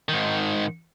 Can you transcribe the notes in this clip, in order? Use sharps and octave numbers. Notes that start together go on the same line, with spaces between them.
G#2 D#3